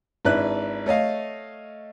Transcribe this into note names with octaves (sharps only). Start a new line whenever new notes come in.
G#1 D4 E4 B4 F#6
A3 C#5 D#5 F5